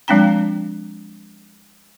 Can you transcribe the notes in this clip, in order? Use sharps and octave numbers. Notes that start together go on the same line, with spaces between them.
F3 G#3 C4 D4 G5 A#5